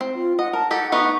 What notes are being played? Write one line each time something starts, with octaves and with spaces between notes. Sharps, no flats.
C4
F4
D#5 F#5
A#4 A5
D#4 G4 A4 F#5
A3 B3 D#4 C#6